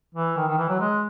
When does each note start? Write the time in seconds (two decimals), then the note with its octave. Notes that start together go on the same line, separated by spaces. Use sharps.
0.15 E3
0.37 D#3
0.48 D#3
0.58 E3
0.69 F#3
0.80 G#3